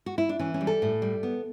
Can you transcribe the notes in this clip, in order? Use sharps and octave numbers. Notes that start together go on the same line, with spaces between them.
F#4
E4
D4
E3 C#4
C#4
G3
A4
A2
G3
B3